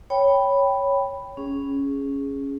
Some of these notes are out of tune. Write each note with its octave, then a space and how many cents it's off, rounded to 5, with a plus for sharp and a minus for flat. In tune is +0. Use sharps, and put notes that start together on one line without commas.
C#5 +0 G5 +0 B5 +0
C#4 +0 G#4 +0